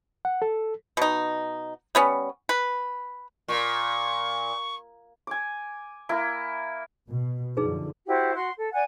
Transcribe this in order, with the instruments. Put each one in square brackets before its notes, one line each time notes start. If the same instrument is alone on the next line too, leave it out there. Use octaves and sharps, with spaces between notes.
[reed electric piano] F#5
A4
[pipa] B2 D#4
G3 B3 C#4
B4
[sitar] A#2 [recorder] C#6
[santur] G#5 D6
A#3 E4
[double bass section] B2
[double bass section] F#2 D3 F3 [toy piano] D#4 G#4 B4
[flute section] E4 F#4 G4 C5
F#4 F#5 C6
A4
D5 F#5 G#5